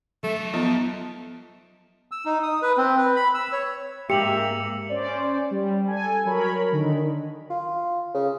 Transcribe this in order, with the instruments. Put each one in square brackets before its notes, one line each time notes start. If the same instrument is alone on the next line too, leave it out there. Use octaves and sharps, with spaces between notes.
[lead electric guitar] F#3 E5 [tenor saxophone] A3
[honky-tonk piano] F3 [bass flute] B3 [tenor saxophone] D#4
[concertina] E6
D#4
D#6
B4
C4
B4
B5
E6
C#5
[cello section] G#2 A#3 [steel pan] G4 [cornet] E5 [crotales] C#7 F7 F#7
[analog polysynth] C#4 C5 D5
G3
A4 G#5
F#3 A#4 C#5 B5
D3 D#3
[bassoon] F4
C#3